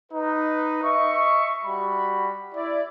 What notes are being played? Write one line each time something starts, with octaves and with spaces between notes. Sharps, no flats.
D#4 B4
D#5 E5 C#6
G3 F#4 B5
E4 D5